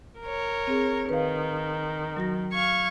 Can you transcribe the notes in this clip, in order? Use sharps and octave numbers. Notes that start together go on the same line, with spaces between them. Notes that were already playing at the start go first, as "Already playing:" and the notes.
A#4 C#5
C4 G#4
D#3 B4 F5
F#3 F#4 A#6
F5 C#6 G#6